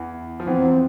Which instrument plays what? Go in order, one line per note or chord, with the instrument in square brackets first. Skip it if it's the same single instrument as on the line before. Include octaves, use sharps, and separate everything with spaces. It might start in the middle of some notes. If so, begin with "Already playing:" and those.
Already playing: [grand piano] E2 E3
F3
[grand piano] E2 E3 [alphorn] C4
[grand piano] F#3
F3